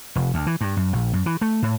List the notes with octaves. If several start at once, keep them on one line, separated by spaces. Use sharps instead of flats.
F1
D2
E3
G2
F#2
A#1
F#2
E3
A3
A2